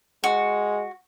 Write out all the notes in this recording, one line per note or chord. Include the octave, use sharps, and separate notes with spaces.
G#3 F#4